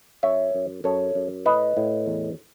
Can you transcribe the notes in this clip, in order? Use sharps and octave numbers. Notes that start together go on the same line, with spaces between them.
F#2 C#5 E5
F#2
F#2 A4 C#5
F#2
A2 B4 D#5
A2
E2